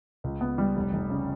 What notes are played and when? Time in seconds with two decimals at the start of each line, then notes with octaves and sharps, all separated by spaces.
0.24 C#2
0.41 B3
0.58 G3
0.76 F1
0.93 F1
1.10 C#3